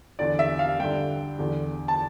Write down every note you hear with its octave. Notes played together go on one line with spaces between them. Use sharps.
E2 D3 D5
E5
F5
G2 D3 G5
E2 D3
A5